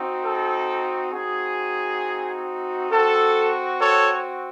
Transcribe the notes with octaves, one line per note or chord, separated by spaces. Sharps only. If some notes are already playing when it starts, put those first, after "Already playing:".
Already playing: C4 D#4 F#4
A4
C4 D#4 F#4 G#4
C4 F#4 A4
A4 C#5